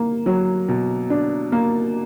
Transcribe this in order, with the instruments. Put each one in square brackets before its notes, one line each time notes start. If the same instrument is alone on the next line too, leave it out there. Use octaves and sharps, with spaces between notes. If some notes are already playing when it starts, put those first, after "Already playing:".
Already playing: [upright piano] A#3
F#3
B2
D4
A#3